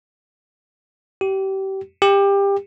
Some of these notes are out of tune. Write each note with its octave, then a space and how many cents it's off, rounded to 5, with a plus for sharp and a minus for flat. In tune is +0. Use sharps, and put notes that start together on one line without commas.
G4 -25
G4 +25